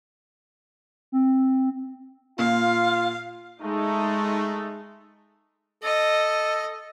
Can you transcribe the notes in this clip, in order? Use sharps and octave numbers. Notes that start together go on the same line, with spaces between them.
C4
A#2 F4 F5
G#3 A3 D#4
A4 D#5